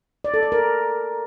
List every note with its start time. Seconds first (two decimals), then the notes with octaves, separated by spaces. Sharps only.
0.24 D5
0.34 A4
0.43 D5
0.52 A#4